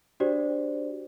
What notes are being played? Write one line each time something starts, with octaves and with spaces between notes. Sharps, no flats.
D4 F#4 G4 C5 D5